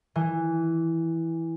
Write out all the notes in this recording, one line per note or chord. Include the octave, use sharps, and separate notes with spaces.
E3